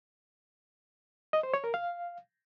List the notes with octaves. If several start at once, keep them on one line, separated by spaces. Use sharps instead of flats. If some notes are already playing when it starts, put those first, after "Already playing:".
D#5
C5
C#5
A#4
F5